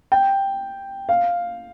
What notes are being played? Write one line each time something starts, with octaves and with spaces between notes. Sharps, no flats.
G5
F5